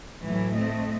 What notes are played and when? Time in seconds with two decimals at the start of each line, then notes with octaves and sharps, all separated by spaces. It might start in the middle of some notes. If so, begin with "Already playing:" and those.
0.24 A2 E3 F#3 A3
0.55 A3 C4 D#5